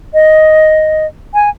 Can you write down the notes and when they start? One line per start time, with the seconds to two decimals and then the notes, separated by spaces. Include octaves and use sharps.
0.14 D#5
1.34 G#5